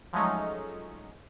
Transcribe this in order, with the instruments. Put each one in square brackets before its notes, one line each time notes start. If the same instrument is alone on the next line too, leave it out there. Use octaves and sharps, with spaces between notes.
[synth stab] F3 F#3 G#3 A3 C#4 D#4